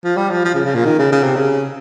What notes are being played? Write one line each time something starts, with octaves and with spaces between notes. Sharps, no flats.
F3
G3
F3
F3
C#3
C#3
A#2
D#3
C#3
C#3
C3
C#3